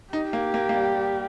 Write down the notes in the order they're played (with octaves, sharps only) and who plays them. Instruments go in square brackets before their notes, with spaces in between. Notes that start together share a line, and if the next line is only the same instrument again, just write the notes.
[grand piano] D#4 [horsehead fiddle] G4
[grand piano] A#3
A#3
A#3
G3
G3